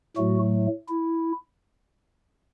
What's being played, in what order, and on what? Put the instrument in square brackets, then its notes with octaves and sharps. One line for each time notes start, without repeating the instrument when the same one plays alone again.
[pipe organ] A2 F#3 A3 F#4
E4